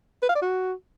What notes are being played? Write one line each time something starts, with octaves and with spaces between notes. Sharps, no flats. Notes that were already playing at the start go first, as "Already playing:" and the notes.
B4
F5
D5
F#4